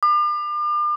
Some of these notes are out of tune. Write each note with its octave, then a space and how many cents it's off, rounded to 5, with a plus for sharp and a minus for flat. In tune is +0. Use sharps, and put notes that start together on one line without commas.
D6 +40